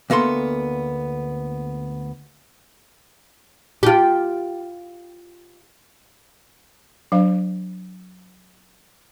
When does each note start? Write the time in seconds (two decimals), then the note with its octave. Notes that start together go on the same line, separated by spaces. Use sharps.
0.10 D2 A#3 B3 A4 C6
3.83 F4 G4
7.12 F#3 D4 C5 F5